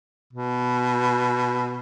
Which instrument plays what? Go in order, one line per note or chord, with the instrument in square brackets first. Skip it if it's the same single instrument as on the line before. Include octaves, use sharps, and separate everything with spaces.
[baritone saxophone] B2